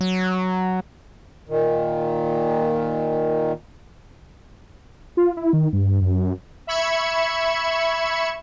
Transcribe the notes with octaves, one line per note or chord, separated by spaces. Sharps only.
F#3
A#2 D#3
F4
E4
D#3
G2
F#2
E5 B5 C#6 G#6 C#7 E7